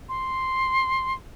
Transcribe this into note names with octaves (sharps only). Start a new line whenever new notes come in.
C6